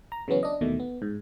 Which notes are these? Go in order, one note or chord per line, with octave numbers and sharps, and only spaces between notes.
A#5
C#3 E3 F#3 B3 C#4
D4 D#5
D#2 B2 D#3 E3 A3
B3
G#2